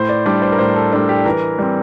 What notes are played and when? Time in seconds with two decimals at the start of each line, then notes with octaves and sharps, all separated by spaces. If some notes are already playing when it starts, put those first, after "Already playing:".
Already playing: A2 C5
0.09 D5
0.26 G3 D4 D5
0.42 C5
0.52 A#4
0.59 A2 C5
0.76 A4
0.92 G3 D4 A4
1.09 G4
1.25 E3 A#4
1.59 G3 C4